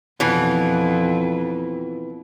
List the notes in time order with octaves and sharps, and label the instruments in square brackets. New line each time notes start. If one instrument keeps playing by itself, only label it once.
[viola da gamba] F2 [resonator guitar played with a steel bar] B2 E3